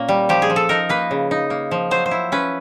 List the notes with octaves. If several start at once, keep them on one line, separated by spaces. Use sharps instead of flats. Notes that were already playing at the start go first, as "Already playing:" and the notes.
Already playing: A#2 A#3 C#4
G3
F3 G4
G#4
F3
A4
D#4 A#4
A#3 B4
C#3
D#4
A#3
F3
F#3 C5
C5
E4
C#4 B4